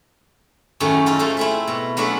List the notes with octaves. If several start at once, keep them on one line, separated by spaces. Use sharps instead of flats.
F#2 A2 D#3 A3 C#4 G#4
D#4 F4 A4
A3 G#4 C5 F5
A3 C4 E4
B2
F#3 A3 D4 F4 G#4 E5